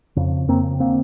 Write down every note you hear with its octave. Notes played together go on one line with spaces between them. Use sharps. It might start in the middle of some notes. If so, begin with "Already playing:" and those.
F2 C#3
F2 C#3 A#3 C4
D3 A#3 C4